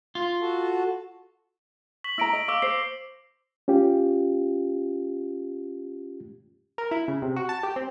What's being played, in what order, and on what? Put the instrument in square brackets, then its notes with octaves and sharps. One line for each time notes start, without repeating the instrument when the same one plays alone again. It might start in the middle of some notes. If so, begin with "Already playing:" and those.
[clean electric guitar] F4
[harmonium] F#4 A4
[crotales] C#6 B6 F#7
[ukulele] E4 A#5 [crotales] E6 A#6 D7
[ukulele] D#5
[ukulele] F5 [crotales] C#6 D6 E6
[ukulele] C5 [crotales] C7
[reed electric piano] C#4 F4 G4
[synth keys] A#4
E4
C#3
C3
F#4
A5
G4
C4